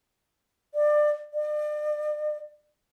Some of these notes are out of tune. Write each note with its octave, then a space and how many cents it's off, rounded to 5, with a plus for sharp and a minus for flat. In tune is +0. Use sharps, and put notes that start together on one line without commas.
D5 +25
D5 +40